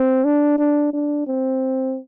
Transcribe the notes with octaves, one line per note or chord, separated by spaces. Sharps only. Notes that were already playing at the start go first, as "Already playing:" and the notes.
Already playing: C4
D4
D4
D4
C4